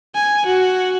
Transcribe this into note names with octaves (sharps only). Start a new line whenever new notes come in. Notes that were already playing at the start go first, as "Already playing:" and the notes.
G#5
F#4